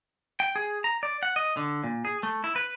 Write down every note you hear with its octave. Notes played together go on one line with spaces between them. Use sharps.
G5
G#4
A#5
D5
F#5
D#5
D3
A#2
G#4
A3
E4
B4